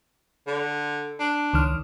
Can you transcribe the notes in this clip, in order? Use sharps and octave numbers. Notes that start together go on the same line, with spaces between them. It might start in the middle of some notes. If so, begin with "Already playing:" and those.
D3
D4
C#2 D#3 F6